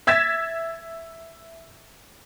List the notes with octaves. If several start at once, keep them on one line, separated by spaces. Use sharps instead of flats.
E5 E6 G#6 A6 B6 E7